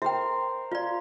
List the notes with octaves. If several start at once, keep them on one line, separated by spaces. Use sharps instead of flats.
A#4 C5 E5 G5
F4 D5 F5